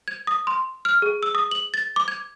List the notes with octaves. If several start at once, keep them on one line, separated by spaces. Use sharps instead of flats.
G#6
D#6
C6
F6
G#4
E6
D#6
F#7
A6
D6
G#6